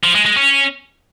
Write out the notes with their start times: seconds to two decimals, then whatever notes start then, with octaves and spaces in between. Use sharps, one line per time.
0.03 F3
0.14 G#3
0.25 G#3
0.36 C#4